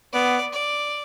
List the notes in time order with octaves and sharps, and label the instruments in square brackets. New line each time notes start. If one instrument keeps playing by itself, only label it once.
[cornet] B3 [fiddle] D5
[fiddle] D5